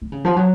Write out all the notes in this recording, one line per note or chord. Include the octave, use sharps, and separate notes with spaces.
D3
C#3
F3
F#3